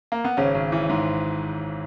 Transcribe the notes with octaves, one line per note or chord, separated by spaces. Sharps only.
A#3
B3
G#1 C#3 C#4
G#1
E3
G#2